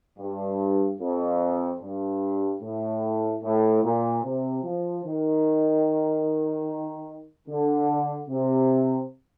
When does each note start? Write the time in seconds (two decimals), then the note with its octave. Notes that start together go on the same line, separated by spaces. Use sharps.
0.19 G2
0.99 F2
1.80 G2
2.61 A2
3.42 A2
3.83 A#2
4.23 C3
4.63 F3
5.04 D#3
7.48 D3
8.28 C3